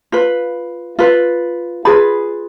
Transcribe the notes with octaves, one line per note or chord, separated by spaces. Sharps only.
F4 B4
F4 B4
F4 G#4 B4 B5